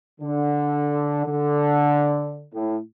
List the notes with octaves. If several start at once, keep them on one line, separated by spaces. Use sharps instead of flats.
D3
D3
A2